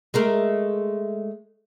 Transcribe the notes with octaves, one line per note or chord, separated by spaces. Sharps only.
G#3 A3 A#4